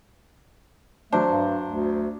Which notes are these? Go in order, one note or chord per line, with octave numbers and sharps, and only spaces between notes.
F#3 A3 D4 C5
G2
D2